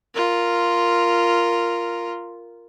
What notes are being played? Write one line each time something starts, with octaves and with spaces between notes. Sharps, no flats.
F4 A#4